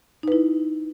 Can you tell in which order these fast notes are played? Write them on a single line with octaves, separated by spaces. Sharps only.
D#4 B4 E4